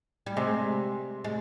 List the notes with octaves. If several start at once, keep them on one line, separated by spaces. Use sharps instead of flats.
G3
C3 G#3
G#3